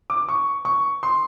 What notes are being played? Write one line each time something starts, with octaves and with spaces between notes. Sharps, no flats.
D6
C#6
C#6
C6